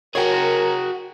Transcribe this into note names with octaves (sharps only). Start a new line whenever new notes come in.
F#4 G#4 A#4 C#5 G5